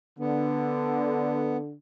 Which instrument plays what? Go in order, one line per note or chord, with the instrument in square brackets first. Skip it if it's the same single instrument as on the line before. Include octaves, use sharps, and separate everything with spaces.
[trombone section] D3 [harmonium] B3